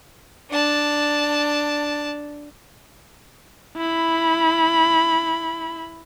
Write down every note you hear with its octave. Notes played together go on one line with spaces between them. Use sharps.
D4 A5
E4 B5